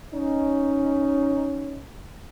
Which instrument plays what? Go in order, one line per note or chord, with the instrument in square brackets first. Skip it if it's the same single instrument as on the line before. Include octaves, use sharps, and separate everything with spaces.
[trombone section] C#4 D#4